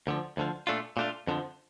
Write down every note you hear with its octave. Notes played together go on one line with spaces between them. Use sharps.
D2 D3 F3
D2 D3 F3
A#2 A3 D4 F4
A#2 A3 D4 F4
F2 D3 F3